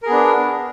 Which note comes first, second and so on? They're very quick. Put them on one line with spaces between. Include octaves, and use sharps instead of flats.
A#4 G#4 B3 D4